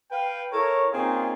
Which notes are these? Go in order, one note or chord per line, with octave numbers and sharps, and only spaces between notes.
B4 F5 G5
E4 A4 A#4 C#5
A#3 C4 C#4 D#4 F4 G#4